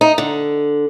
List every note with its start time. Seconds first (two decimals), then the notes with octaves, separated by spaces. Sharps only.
0.01 D#4
0.18 D3